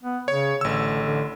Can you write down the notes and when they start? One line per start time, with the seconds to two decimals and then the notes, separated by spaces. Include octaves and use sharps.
0.03 B3
0.28 C#3 C#5
0.61 A1 D3 E6
1.02 D3